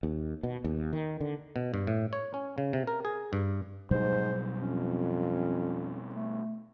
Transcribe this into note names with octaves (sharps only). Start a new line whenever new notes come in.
D#2
B2
D#2
D#3
D3
B2
G2
A2
C#5
C#4
C#3
C3
A#4
G#4
G2
G#2 B2 F#3 G3 C5
F2 C#4
A3